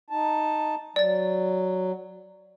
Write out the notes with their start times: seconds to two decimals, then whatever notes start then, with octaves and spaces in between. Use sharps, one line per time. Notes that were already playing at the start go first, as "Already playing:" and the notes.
0.10 D#4 A5
0.96 F#3 D5 A6